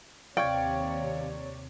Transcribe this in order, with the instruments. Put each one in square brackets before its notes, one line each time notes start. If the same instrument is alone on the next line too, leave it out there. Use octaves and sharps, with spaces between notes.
[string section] D#2 C3 C#5 [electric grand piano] D5 C#6 G#6 [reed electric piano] F5 [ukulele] G5